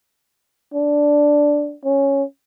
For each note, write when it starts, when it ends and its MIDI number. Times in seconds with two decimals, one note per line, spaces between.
0.74 1.76 62
1.85 2.23 61